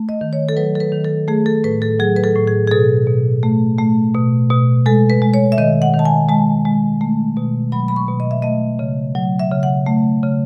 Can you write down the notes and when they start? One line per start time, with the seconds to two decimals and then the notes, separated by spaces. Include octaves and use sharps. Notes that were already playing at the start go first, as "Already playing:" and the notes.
Already playing: A3
0.09 D#5
0.21 D#3
0.33 C#5
0.49 A4
0.57 F#3 B4
0.75 A4
0.80 B4
0.92 D#3
1.05 A4
1.28 A3 G#4
1.46 A4
1.64 A2 B4
1.82 A4
2.00 F#3 G#4
2.16 B4
2.24 A4
2.35 A2
2.47 G#4
2.67 G#4
2.71 B2 A4
3.07 B2
3.43 A3
3.79 A3
4.15 B2
4.51 B2
4.86 G#3 A4
5.10 B4
5.22 G#3
5.34 C#5
5.52 E5
5.58 D#3 D#5
5.82 F#5
5.94 D#3
5.99 A5
6.05 G#5
6.29 G#3 A5
6.65 G#3
7.01 A3
7.37 B2
7.72 F#3 B5
7.88 B5
7.96 C#6
8.08 B2
8.20 D#5
8.31 E5
8.42 A3 D#5
8.79 C#3
9.15 F#3
9.39 E5
9.51 C#3
9.63 F#5
9.87 A3
10.23 C#3